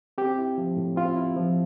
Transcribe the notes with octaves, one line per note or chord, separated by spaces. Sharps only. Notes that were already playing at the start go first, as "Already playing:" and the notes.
C4 G4
E4
F3
A2
C4 F4
E4
F3